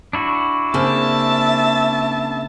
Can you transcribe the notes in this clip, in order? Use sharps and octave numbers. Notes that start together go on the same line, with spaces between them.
D4 E4 F#4
C#3 A#3 C4 E5 A5